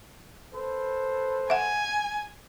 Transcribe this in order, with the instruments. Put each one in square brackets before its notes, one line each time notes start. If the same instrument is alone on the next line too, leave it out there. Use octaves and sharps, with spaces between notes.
[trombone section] A4 B4 C5
[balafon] E5 F#5 [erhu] G#5